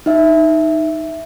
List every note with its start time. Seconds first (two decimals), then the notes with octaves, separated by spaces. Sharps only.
0.06 D#4 E5